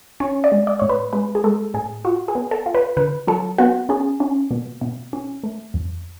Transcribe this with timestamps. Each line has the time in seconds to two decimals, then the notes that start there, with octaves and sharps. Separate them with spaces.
0.20 C#4 C#5
0.44 D5
0.52 G#3
0.67 D5
0.80 A2 C#5
0.89 B4
1.13 G#3 B4
1.35 G#4
1.44 G#3 A4
1.74 A2 G#4
2.05 F4 F#4
2.28 G#4
2.35 B3
2.51 A4
2.66 F4
2.75 B4
2.97 D3 B4
3.27 F#3 A4
3.58 B3 F#4
3.89 C#4 G#4
4.20 C#4
4.51 B2
4.81 B2
5.13 C#4
5.44 A3
5.74 F2